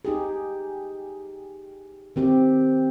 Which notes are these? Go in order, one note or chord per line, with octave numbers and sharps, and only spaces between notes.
D#4 G4 G#4
D#3 C4 G4